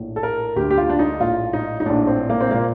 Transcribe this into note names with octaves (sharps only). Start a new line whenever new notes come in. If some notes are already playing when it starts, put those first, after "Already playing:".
Already playing: A#1 A2
A4
A#4
D2 D3 G4
G4
F4
D4
D#4
A#1 A2 F4
D#4
D#4
A#1 A2 D4
C4
A#3
C4
A#2 A#3